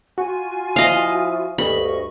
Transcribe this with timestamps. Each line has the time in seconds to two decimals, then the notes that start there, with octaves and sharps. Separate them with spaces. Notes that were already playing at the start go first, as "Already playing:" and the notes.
0.18 F4 F#4 G#5
0.76 F3 E4 D#5 F5
1.58 D2 G2 D#5 B5 C#6